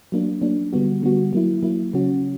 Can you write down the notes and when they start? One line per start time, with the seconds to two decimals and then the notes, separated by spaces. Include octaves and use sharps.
0.12 F#3 A#3 D4
0.42 F#3 A#3 D4
0.73 D3 G3 B3 F#4
1.03 D3 G3 B3 F#4
1.33 F#3 A#3 E4
1.63 F#3 A#3 E4
1.93 C#3 F#3 C#4 F#4